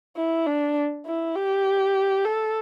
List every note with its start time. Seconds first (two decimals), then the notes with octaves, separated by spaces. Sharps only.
0.16 E4
0.46 D4
1.06 E4
1.35 G4
2.25 A4